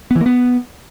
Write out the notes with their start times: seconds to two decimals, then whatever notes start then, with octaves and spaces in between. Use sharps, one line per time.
0.11 B3
0.16 E3
0.21 A#3
0.26 B3